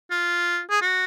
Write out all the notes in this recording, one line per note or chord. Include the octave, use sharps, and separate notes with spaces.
F4
G#4
F#4